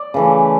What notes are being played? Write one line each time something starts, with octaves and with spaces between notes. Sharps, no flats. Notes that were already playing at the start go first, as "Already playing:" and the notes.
Already playing: D5
C#3 E3 A3